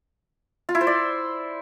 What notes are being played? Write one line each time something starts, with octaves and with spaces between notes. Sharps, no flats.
F4
E4
C5
D5